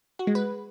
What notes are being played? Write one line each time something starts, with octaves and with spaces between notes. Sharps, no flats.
F#4
G#3
B4